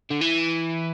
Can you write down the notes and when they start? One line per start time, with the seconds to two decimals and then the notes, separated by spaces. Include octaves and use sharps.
0.11 D3
0.21 E3